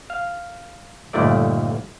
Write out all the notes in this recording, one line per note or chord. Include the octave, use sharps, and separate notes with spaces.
F5
G1 D#2 A#2 D#3 A3 D5